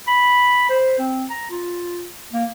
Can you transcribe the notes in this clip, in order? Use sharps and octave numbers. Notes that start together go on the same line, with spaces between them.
B5
C5
C4
A#5
F4
A#3